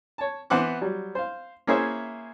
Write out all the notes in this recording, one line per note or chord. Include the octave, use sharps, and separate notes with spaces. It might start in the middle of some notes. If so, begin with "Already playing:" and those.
C#5 A5
E3 B3 C5 F#5 D6
F#3 G3
C5 F5
A#3 C#4 E4 G#4 C5 E5